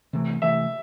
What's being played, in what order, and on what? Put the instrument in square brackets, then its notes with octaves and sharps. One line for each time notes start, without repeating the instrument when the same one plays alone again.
[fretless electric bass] C3 E3 A3
[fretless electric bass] C3 E3 A3 [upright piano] E5